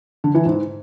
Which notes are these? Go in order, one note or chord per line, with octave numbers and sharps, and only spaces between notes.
D3
E3
G#2